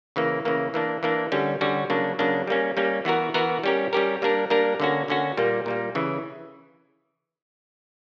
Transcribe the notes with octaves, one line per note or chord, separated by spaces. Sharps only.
C#3 E3 A#3
C#3 E3 A#3
E3 A#3 D4
E3 A#3 D4
D3 G3 C#4 F#4
D3 G3 C#4 F#4
C#3 F#3 A#3 D4
C#3 F#3 A#3 D4
G3 A#3 C#4
G3 A#3 C#4
E3 B3 F#4 A#4
E3 B3 F#4 A#4
G3 C#4 G4 A#4
G3 C#4 G4 A#4
G3 A#3 D4 A#4
G3 A#3 D4 A#4
D3 A#3 C#4 F#4
D3 A#3 C#4 F#4
A#2 G3 A#3
A#2 G3 A#3
C#3 E3